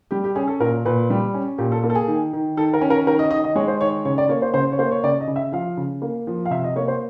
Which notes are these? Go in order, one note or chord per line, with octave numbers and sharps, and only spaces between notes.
G3 G4
G4
C#4 G#4
A4
A#2 A#4
A#2 B4
G3
C#4
A#2 G4
A4
A#3
A4
G#4
D#3
D#3
D#3 A4
A#4
C#4
A#4
D#3 A#4
D#5
D#3 D#5
D#5
G#3 C#5
C5
D#3 C#5
C#3 C#5
D5
A#3 C#5
C5
C#3 C5
C#5
A#3 C5
C#5
C#3 D5
D#5
C#3
E5
F3 F5
C#3
A#3
F3
F5
C3 E5
D#5
A#3 C#5
C5